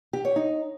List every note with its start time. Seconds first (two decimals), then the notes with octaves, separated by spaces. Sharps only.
0.13 G4
0.25 C#5
0.36 D#4